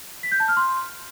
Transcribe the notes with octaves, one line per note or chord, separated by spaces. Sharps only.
B6
G6
A5
F6
C6